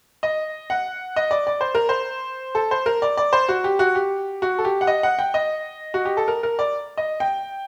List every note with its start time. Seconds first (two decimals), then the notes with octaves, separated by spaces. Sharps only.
0.23 D#5
0.70 F#5
1.16 D#5
1.31 D5
1.47 D5
1.61 C5
1.75 A#4
1.89 C5
2.55 A4
2.71 C5
2.86 A#4
3.02 D5
3.17 D5
3.33 C5
3.49 F#4
3.64 G4
3.79 F#4
3.95 G4
4.42 F#4
4.58 A4
4.65 G4
4.81 F#5
4.87 D#5
5.03 F#5
5.19 G5
5.34 D#5
5.94 F#4
6.05 G4
6.17 A4
6.28 A#4
6.43 A#4
6.59 D5
6.97 D#5
7.20 G5